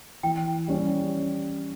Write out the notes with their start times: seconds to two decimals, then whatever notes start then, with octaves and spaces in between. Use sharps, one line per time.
0.23 E3 G5
0.68 G3 C#4